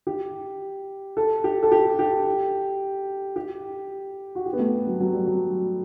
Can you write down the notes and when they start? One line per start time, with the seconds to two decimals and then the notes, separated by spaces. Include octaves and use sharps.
0.07 G4
1.17 A4
1.44 G4
1.63 A4
1.72 G4
1.99 G4
3.36 G4
4.35 F#4
4.46 G4
4.53 B3
4.59 A3
4.87 F#3
5.00 F#3
5.13 G3
5.26 F#3